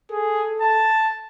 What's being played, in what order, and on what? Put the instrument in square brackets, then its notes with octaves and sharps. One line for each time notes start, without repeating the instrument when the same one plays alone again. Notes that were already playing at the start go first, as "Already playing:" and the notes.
[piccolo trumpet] G#4 [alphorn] A4
[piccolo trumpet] A5